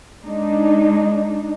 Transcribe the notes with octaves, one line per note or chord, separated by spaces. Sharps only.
G#3 D4 D#4